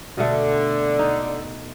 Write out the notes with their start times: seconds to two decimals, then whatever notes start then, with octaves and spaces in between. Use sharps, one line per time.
0.17 B2 D3 A3
0.99 D#4